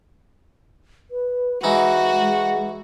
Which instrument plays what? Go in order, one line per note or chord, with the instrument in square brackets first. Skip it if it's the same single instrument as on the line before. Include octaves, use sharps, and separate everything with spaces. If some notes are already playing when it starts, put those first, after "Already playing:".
[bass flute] B4
[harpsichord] E3 D#4 [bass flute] G#3 [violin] F#4
[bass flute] G#3